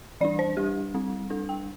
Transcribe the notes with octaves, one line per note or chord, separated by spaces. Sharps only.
E3 G3 D4 D5
C5
G3 D4 G4
G3 C4
G3 D4 A4
G5